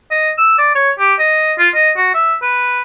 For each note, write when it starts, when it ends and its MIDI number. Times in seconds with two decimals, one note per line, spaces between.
0.11 0.30 75
0.38 0.55 88
0.58 0.71 74
0.75 0.91 73
0.99 1.14 67
1.19 1.53 75
1.59 1.69 65
1.75 1.91 75
1.97 2.14 66
2.14 2.35 76
2.42 2.82 71